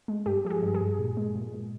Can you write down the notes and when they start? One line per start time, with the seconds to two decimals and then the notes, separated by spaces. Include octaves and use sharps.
0.08 G#3
0.26 G2 G4
0.45 F3 G4
0.50 G#4
0.62 G2
0.74 G#4
0.81 G2
0.99 A#2
1.17 G#3
1.36 A#2
1.53 A#2